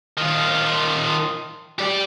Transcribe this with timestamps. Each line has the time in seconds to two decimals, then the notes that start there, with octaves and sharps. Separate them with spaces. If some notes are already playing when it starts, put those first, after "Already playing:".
0.17 D#3 F4
1.79 G4 D5